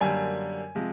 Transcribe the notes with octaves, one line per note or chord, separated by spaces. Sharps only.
F#2 D3 G3 A#3 G#5
C3 F3 G#3